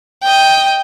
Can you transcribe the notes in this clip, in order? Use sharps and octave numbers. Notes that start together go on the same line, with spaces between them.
D#5 G5